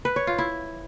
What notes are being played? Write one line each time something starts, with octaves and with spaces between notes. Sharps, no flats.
B4
C#5
F4
E4